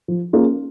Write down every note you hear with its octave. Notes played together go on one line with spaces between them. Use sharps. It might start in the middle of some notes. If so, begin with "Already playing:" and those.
F3
A#3 C#4 F4 G#4